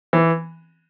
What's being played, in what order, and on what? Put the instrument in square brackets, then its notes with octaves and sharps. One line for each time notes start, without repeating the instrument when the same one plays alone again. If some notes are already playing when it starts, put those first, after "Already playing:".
[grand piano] E3